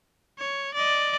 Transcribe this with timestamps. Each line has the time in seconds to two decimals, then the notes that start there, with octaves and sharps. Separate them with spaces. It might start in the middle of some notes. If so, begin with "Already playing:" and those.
0.39 C#5
0.74 D5 D#5